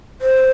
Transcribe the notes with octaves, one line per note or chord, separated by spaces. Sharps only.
C5